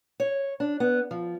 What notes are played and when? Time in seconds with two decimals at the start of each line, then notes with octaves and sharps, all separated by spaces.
0.20 C#5
0.60 D4
0.80 B3
1.11 F3